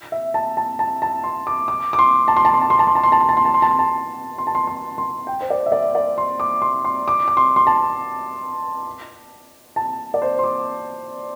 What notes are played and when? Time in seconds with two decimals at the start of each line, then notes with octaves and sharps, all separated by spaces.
0.12 E5
0.34 A5
0.57 A5
0.79 A5
1.02 A5
1.24 C6
1.47 D6
1.68 D6
1.93 D6
1.99 C6
2.28 A5
2.37 C6
2.45 A5
2.54 C6
2.61 A5
2.70 C6
2.79 A5
2.87 C6
2.95 A5
3.03 C6
3.12 A5
3.20 C6
3.29 A5
3.37 C6
3.45 A5
3.54 C6
3.62 A5
3.71 C6
3.79 A5
4.38 C6
4.47 A5
4.55 C6
4.67 C6
4.98 C6
5.27 G5
5.41 C5
5.50 D5
5.66 E5
5.72 D5
5.95 D5
6.18 C6
6.40 D6
6.62 C6
6.85 C6
7.08 D6
7.28 D6
7.37 C6
7.56 C6
7.67 A5
9.76 A5
10.14 D5
10.22 C5
10.39 C6
10.44 D6